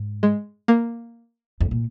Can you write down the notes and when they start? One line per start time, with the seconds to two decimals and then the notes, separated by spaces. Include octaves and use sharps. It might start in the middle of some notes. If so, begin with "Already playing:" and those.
Already playing: G#2
0.23 G#3
0.68 A#3
1.61 F2
1.71 A#2